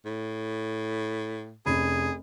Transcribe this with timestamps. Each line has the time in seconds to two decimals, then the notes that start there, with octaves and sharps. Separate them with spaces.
0.05 A2
1.66 F1 C#4 G#4 B5